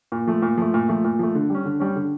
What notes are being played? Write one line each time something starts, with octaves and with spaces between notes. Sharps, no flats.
A#2
F3 A3
A#2
F3 A3
A#2
F3 A3
A#2
F3 A3
D3
G3 C#4
D3
G3 C#4
D3